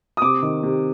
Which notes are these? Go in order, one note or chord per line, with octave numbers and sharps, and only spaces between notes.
D#6
C3 D6
D#3
C3